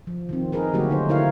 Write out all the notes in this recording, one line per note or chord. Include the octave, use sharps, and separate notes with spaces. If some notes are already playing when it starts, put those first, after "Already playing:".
F3
D#3 C4
D#4 G#4 A#4 B4
D3 F#3 A3 A#3 F#4 G4
D3 D#4 C5
D3 E4 A#4 C#5 F5